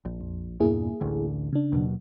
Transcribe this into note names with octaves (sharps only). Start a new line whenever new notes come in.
A#1
F2
E2 G2 A#2 A#3 E4 G#4
A1 D2 D3
C#3 D4
D#2 B2 F#3